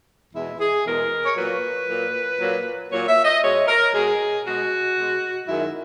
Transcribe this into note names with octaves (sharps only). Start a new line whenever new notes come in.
E2 B2 G#3 E4
G#4
E2 B2 G#3 A#4
C#5
A#2 F#3 A#3 B4
A#2 F#3 A#3
A#2 F#3 A#3
A#2 F#3 A#3 C#5
E5
D#5
B2 G#3 C#5
A#4
B2 G#3 G#4
B2 G#3 F#4
B2 G#3
F#2 D#3 G#3 E4